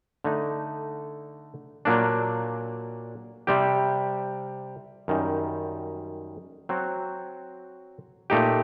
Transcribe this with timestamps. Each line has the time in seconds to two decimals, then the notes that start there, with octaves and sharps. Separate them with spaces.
0.24 D3 A3 D#4
1.85 A#2 F#3 A#3 D4
3.47 C3 G3 C4 G4
5.08 F#2 D#3 G3
6.69 F#3 C4 F#4
8.30 A#2 A3 D#4 G4